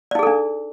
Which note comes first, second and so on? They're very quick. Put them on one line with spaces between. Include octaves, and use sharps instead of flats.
D5 D#4 G#4 A4 D4